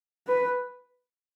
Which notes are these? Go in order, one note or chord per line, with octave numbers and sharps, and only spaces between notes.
B4